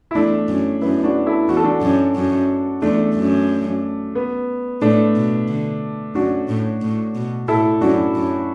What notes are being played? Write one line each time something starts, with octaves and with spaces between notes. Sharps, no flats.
E4
E2 A3 D4
F#2
F#2 B3 E4
D4 F#4
E4 A4
E2 F#4
A4
D4 F#4
F#2
F#2
E2 A3 D4
F#2
B3
A2 A3 D4
B2
D3
F#2 D4 F#4
A2
A2
B2
A2 E4 A4
F#2 D4 F#4
F#2